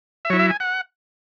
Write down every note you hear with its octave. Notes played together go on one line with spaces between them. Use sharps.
E5
F#3 E4 C#5
E5
G#5
F#5